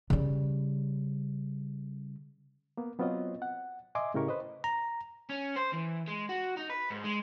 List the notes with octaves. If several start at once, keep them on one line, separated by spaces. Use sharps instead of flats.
C#3 G3
A#3 B3
F#3 B3 C4 F4 C#5 D#5
F#5
D#5 E5 G#5 C6 D6
A2 C#3 E4 G4 A#4 C#6
B4 C5 D#5
A#5
C#4
C5
E3
G#3
F#4
D#4
B4
G#2
G#3